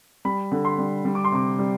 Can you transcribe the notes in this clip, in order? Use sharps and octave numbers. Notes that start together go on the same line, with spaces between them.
G3 B5
D3
C6
G3
G3
D6
C6
C3 D6
G3